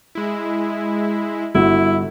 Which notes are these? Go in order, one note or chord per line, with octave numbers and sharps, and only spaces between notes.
G#3 E4
G1 E4 F#4